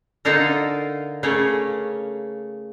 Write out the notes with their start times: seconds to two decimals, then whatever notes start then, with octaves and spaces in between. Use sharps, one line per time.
0.25 D3 A#3 D#4 F4 A4 A#4
1.23 C#3 A3 A#3 C#5